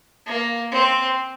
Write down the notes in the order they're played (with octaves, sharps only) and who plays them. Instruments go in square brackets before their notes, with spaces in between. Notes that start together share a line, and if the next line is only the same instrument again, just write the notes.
[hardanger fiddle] A#3
C4